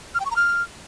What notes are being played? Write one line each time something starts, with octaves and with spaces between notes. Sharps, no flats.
F6
G5
C#6
A#5
F6